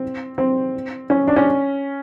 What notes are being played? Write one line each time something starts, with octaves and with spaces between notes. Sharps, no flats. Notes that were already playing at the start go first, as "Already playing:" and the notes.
Already playing: C4
C4
C#4
D4
C#4